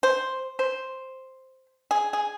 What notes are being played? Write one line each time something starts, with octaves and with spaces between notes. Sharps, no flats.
C5
C5
G#4
G#4